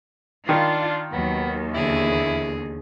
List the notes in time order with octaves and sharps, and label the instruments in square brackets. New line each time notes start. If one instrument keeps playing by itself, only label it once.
[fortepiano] D#3 [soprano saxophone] D4 [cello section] F4
[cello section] D#2 [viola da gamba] F#3 [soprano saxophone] B3
[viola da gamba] E2 D3 G#4 [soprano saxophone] E4